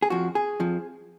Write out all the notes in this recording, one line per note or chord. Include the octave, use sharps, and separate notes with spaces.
G#4
F2 F3 F#4
G#4
F2 F3